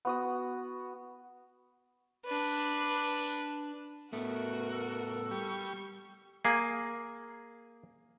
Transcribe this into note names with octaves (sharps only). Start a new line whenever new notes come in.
B3 F#4 D#6
D4 B4
A2 A3 B3 F#4 A#4 B4
A4
G3 C#6
A#3 G#4